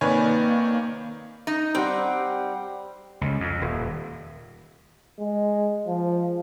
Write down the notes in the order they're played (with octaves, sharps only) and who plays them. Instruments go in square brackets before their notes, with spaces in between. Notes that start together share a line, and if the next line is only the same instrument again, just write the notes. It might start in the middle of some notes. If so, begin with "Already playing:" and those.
[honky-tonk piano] C3 B4 D5 [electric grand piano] D#3 C#5 G#5 [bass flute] A#3
[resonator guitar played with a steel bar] D#4
[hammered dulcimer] G3 G4 F#5 [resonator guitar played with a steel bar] C4
[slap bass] C#2
F2
D#1
[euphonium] G#3
F3